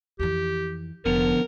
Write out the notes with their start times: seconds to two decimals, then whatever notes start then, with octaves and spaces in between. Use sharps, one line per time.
0.19 F2 E3 G4
1.05 F1 D3 F3 B3 A#4